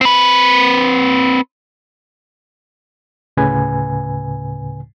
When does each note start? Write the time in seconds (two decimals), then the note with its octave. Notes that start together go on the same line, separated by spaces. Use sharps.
0.01 C4 B4
3.37 D2 A2 C#3 B4 G#5